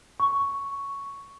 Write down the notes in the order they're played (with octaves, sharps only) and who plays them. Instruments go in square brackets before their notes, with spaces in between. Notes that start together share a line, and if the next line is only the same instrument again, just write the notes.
[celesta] C#6